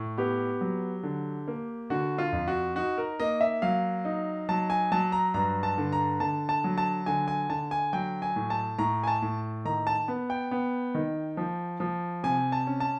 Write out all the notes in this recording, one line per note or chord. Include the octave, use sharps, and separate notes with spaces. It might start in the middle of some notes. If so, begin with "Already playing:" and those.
Already playing: A2
B3 G4
F#3
D3
A#3
D3 F#4
F4
F2
F#4
D#4 F#4
A#4
A#3 D#5
E5
F#3 F5
D#4
F#3 A5
G#5
F#3 A5
A#5
G2 A#5
A5
D3
A#5
D3 A5
A5
F#3
A5
D3 G#5
G#5
D3 A5
G#5
F#3 G5
G#5
A2
A5
A2 A#5
G#5
A5
A2
D#3 A#5
A5
B3
G5
B3
D#3
F3
F3
C3 G#5
A5
C#4
A5